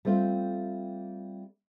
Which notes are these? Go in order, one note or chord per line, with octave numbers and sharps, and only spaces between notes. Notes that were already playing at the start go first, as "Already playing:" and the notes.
G3 A3 C4 F4